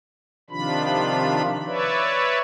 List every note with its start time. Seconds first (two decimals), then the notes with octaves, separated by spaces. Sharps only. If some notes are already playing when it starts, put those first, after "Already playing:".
0.50 C3 D#3 F3 D4 F4 B5
1.67 B4 C#5 D5 E5